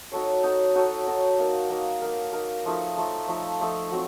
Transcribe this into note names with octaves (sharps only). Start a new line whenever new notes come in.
D#4 F#4 A4 C#5
D#4 F#4 A4 C#5
D#4 F#4 A4 C#5
D#4 F#4 A4 C#5
A#3 D#4 A#4
A#3 D#4 A#4
A#3 D#4 A#4
A#3 D#4 A#4
F3 A3 D#4 A4
F3 A3 D#4 A4
F3 A3 D#4 A4
F3 A3 D#4 A4
F#3 C4 F#4